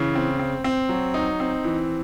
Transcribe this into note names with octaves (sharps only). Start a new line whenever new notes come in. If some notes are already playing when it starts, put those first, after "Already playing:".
Already playing: C#3 E3
C4
C4
C4
F#3
D#4
C4
E3